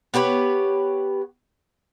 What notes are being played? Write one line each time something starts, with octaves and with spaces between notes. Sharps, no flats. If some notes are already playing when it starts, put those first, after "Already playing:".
B3 G4 B4 C#5